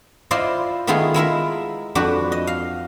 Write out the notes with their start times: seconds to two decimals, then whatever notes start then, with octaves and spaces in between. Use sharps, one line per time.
0.31 E4 F4 C5 D5 D#5
0.87 D#3 A3 B3 E4 F4 G#4
1.14 G#3 E4 A#4 E5
1.95 F2 D4 F#4 B4
2.32 D#5
2.47 F5